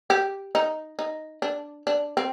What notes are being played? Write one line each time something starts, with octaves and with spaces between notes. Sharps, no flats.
G4
D#4
D#4
D4
D4
C4